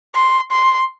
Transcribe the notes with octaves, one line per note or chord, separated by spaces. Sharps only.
C6
C6